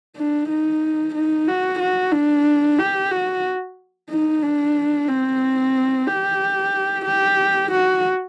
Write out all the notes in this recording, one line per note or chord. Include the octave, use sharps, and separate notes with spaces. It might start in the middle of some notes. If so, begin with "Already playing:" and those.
D4
D#4
D#4
F#4
F#4
D4
G4
F#4
D#4
D4
C4
G4
G4
F#4